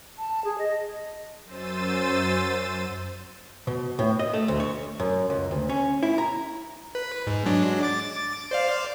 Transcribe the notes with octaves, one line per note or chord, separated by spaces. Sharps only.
A5
G#4
D#5
F#2 C5 E6 A6 D#7
B2
A2
D#5
A3
D2
C#5
F#2
C#2
D2
C#4
E4
A#5
B4
G#2
F#3 G#3 D4
D6 A6
C5 D5 F5